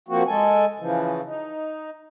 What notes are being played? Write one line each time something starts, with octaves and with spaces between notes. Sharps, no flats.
F3 A#3 C4 F#4
G#3 A4 G#5
C#3 E3 F3
D#4